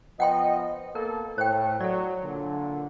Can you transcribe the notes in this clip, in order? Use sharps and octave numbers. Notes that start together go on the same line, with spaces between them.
F3 B3 D#5 F#5 G5 C6
A#3 B3 A4 A#4
A2 C5 G5
F#3 A4 D5
A#2 D3